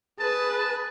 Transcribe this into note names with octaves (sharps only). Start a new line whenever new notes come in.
G#4 B4 A5